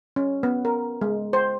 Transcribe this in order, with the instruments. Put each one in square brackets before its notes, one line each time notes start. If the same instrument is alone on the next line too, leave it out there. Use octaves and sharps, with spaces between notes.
[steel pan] C#4
B3
A#4
G#3
C5